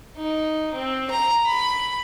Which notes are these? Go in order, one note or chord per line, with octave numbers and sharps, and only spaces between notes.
D#4
C4
A#5
B5